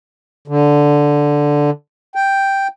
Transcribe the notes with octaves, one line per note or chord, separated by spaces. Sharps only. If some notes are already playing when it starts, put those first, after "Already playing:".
D3
G5